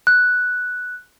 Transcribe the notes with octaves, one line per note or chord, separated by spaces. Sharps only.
F#6